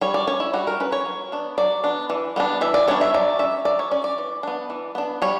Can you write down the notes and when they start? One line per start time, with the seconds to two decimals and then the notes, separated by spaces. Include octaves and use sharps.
0.01 G3 C#5
0.14 D5
0.27 C#4 C#5
0.40 E4
0.53 G3 F#4
0.67 A#4
0.80 C#4 B4
0.92 C#5
1.06 F#3
1.32 B3 D4
1.58 F#3 D5
1.84 B3 D4
2.10 E3
2.36 G3 B3 D4
2.61 E3 E5
2.74 D5
2.88 G3 B3 D4 C#5
3.01 E5
3.14 F#3 D5
3.39 C#4 E5
3.65 F#3 D5
3.79 C#5
3.91 C#4 D5
4.04 D5
4.18 E3
4.43 B3 D4
4.70 E3
4.95 B3 D4
5.22 G3 C#5